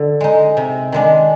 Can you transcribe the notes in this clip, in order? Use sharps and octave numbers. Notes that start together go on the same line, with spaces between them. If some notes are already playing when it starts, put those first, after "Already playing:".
Already playing: D3
G#3 D#4
C3
D#3 G#3 D4